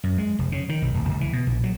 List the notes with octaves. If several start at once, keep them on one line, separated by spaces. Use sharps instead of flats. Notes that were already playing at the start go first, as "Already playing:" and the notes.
F#2
G#3
F1
C#3
D#3
B1
D1
C#2
E3
B2
A#1
F#3